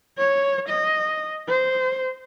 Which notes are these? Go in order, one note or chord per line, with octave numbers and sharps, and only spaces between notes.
C#5
D#5
C5